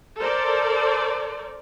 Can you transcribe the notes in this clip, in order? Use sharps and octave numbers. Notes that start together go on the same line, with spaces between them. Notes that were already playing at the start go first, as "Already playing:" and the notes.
A4 A#4 C5 D5